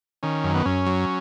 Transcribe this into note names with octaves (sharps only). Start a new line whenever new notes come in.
D#3 C#4
F#2
B3
F#2 C#4
F#3